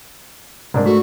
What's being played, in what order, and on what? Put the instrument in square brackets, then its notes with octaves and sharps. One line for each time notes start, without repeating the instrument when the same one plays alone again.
[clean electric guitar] C2 [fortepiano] G#2 D4 A#4
[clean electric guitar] A3 [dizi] F#4